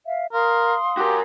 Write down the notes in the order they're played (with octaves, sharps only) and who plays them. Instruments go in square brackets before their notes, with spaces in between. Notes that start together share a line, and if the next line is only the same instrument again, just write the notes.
[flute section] E5 F5
[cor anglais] A#4 [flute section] F5 C6 D#6
[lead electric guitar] F#4 A#4 [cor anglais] G4